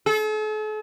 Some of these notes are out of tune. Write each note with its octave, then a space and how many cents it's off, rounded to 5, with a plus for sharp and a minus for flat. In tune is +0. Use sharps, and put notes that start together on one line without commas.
A4 -45